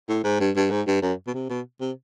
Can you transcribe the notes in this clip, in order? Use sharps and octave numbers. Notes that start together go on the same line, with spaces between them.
A2
G#2
G2
G2
G#2
G2
F#2
B2
C3
B2
C3